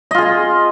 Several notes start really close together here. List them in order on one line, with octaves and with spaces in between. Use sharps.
D#5 F4 G#4